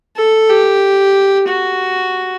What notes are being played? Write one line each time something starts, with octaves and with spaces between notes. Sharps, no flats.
A4
G4
F#4